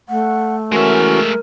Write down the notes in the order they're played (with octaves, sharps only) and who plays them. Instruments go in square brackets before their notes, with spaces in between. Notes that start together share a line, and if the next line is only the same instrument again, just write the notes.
[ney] A3 [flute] F#5
[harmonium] E3 C#4 F#4 [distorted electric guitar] G#3 E5 [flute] A#4